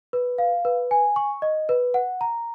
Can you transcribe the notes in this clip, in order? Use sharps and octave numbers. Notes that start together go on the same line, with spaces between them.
B4
F5
B4
G#5
C#6
D#5
B4
F#5
A#5